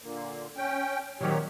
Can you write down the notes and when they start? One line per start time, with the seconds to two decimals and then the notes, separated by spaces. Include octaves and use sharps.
0.02 A#2 D3 A#3
0.57 C#4 G5
1.21 A#2 D#3 F#3 C4 G4 C#5